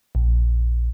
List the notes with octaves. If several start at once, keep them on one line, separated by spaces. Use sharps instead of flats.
A#1